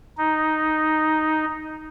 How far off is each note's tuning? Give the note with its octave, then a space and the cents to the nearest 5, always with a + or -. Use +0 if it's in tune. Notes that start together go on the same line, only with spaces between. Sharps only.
D#4 +0